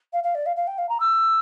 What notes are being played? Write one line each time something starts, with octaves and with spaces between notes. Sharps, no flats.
F5
F5
D5
F5
F5
G5
F5
A#5
E6